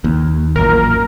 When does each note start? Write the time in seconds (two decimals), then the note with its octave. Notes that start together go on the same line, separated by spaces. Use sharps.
0.04 D#2
0.56 A1 F#2 A#2 A#4